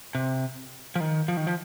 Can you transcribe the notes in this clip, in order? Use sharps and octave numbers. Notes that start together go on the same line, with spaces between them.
C3
F3
D#3
F3
D#3
F3